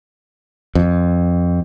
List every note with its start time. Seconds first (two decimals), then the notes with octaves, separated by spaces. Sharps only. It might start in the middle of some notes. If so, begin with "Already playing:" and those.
0.75 F2